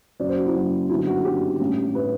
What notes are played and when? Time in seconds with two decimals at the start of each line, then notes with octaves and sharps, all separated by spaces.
0.20 F#1 F#2 F#3 D5
0.29 C5
0.37 F#4
0.46 E4
0.55 F#1 F#2 F#3 F#4
0.90 G1 F#2 F#3 E4
1.07 F#4
1.25 G1 F#2 F#3 G4
1.59 A1 A2 G3
1.95 A2 G3 B4